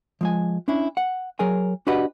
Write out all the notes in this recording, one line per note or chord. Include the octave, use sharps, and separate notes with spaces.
F3 G#3 G#5
C#4 D4 E4
F#5
F#3 G#4 A#4 G#5
D4 F#4 G4 B4 D#5 F#5